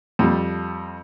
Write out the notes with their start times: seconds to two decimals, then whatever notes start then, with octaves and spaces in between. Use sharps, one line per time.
0.19 F2 G3